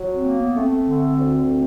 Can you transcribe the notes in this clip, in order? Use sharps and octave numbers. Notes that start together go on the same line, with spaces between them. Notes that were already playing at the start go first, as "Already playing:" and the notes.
Already playing: F#3
C4
A#3
B3
A3 C4
D3
D2
A3